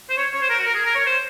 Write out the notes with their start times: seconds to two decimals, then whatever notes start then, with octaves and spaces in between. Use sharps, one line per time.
0.10 C5
0.18 C#5
0.34 C#5
0.42 C5
0.50 A#4
0.58 F#4
0.66 A#4
0.75 G#4
0.85 A#4
0.95 C#5
1.07 C5